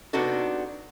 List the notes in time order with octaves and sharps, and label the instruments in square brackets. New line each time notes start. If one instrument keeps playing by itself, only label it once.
[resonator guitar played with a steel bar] C3 B3 D4 D#4 F#4 A4